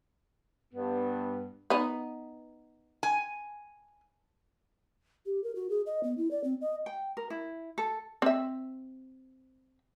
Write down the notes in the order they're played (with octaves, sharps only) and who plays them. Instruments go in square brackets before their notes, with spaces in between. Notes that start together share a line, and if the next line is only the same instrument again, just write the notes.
[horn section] G2 B3
[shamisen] B3 D#4
[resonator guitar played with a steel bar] G#5
[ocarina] G4
A#4
F#4
G#4
D#5
B3
E4
D5
C4
D#5
[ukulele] G5
A#4
E4
A4
[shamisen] C4 E5